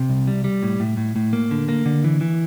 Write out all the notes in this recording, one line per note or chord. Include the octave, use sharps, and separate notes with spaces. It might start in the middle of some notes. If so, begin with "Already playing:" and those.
Already playing: C3
C2
G3
G3
A2
A2
A2
A2
A#3
D3
A#3
D3
E3
E3